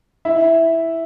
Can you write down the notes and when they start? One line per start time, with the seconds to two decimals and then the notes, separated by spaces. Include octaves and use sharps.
0.25 E4 E5